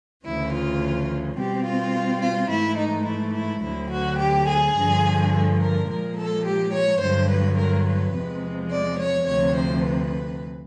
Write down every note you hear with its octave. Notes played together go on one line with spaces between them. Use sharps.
D2 C#3 E3 E4
F4
B2 G3 C4 G4
F4
F4
G#2 E3 A3 E4
D#4
E4
E4
D2 D3 F#3 E4
F#4
G4
G#4
G2 D3 F3
A4
A#4
A#2 F3 G#3 A#4
A4
G4
C#5
G2 D3 F#3 C5
B4
A#4
B4
E2 C3 F3 G#3
D5
C#5
D2 C3 F3 C#5
C5
B4